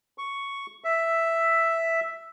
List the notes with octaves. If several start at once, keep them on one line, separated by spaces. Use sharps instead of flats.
C#6
E5